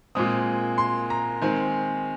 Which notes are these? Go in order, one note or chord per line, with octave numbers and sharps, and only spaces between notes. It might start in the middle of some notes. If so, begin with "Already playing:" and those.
A#2 G#3 C4 D#6
C6
A#5
D#3 G#3 C4 G#5